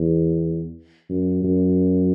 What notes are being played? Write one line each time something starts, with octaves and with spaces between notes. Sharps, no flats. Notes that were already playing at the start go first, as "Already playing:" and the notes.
Already playing: E2
F#2
F#2